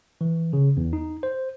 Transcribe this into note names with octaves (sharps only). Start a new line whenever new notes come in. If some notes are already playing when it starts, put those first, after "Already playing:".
E3
C#3
E2
D#4
C5